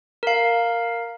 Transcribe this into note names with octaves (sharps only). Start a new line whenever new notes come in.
A#4 F5